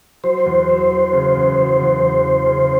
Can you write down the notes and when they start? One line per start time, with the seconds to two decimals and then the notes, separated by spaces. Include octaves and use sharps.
0.24 F#3 C5
0.46 E2
0.69 F#3
0.91 F#3
1.13 C#3
1.35 E2
1.57 F#3
1.80 E2
2.02 E2
2.24 C#3
2.46 C#3